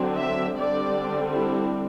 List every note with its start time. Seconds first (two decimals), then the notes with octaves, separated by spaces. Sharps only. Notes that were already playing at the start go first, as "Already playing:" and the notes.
Already playing: D3 F#3 C4
0.18 E5
0.57 D3 G3 C4 D5
1.33 E4